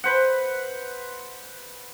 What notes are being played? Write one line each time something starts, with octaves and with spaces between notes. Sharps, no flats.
B4 C5 F#5